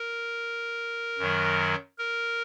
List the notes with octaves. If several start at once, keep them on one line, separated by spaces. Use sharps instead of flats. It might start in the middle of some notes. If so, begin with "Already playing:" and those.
Already playing: A#4
F#2 D#3 F#3
A#4